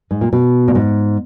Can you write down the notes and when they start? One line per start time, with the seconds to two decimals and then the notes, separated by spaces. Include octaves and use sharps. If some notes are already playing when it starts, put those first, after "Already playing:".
0.11 G#2
0.21 A#2
0.33 B2
0.68 A#2
0.75 G#2